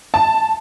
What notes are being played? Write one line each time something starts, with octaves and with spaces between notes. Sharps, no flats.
A5